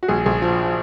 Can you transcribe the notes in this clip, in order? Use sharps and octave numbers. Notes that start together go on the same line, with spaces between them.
F#4
A#1 G#4
A#1 G#4
F3